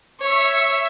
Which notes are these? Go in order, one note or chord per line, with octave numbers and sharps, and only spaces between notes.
C#5 E5 C#6